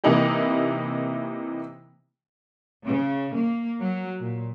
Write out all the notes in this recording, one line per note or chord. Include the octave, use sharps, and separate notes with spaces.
C3 E3 A#3 D#4 E4 G4
C#3
A#3
F#3
A#2